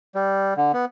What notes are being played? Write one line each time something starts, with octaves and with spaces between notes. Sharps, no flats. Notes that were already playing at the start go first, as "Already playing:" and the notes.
G3
D3
B3